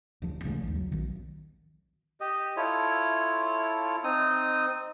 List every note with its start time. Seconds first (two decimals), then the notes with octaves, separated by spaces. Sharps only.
0.22 D1 F3
0.44 G#1 C#3 G#3 A3
0.63 G#1 D#2
0.75 F#3
0.92 A#1 D#3
2.21 G4 D#5
2.57 E4 F4 A4 C#5
4.04 C4 D#4 D#6